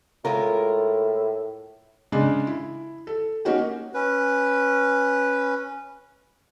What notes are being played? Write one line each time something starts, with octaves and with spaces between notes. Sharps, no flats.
A2 G#3 F4 A#4
C#3 G#3 D4
E4
A4
A#3 C#4 D#4 F#4 G4
C#4 B4